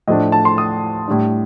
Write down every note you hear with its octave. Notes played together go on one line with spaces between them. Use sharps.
A2 F3 A3 D4 D#5
A5
C6
D#6
A2 G3 D4